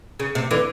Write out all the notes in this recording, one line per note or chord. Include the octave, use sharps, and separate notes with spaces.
C#3
C3
D3 E3